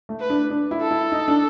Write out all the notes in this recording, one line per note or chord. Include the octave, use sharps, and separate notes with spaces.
A3
B4
D4
D4
E4
A4
E4
D#4
D4